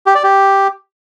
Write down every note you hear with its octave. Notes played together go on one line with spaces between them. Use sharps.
G4
D5
G4